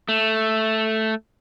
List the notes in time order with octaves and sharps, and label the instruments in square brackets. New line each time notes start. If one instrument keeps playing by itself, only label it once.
[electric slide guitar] A3